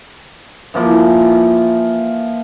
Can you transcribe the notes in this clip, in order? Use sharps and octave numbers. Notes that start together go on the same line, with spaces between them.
E3 F3 A#3